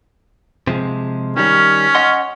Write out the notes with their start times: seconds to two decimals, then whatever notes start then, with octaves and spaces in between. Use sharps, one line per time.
0.67 C3 F3 G#3
1.37 D#3 G3 C#4
1.95 D#5 F#5 C6